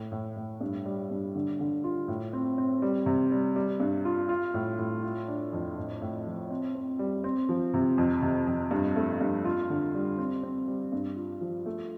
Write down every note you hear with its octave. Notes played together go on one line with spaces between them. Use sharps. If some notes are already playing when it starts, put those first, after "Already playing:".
Already playing: A2
A2
A2
G2
G3
G2
D3
D3
F4
A2
C4
C4
G3
C3
G3
G3
G2
F4
F4
A2
A2
F4
D4
F2
A2
A2
F3
C4
C4
G3
C4
F3
C3
F2
C3
F2
G2
A3
G2
F4
D3
G3
C4
C4
G3
G2
F4
F3
A3